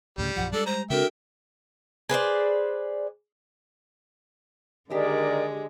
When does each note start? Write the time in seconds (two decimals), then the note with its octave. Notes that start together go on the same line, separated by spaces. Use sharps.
0.18 D2 A2 C#3 G3
0.36 A#1 F#2 F3 F#5
0.53 G3 G#3 D4 A4
0.66 C5 A#5
0.90 C#3 C4 D4 F#4 A4 A#4 E5 G5
2.09 G#4 B4 C5 D5
4.90 D3 D#3 G#3 D4 G4 A#4 D5 D#6